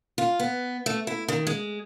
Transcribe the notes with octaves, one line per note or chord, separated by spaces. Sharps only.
F4
B3
A3
E4
D#3
G#3